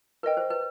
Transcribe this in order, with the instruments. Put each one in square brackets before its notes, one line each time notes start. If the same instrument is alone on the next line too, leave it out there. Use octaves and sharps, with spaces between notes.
[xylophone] A#4 D#5 G5 [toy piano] B4
[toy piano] C5
B4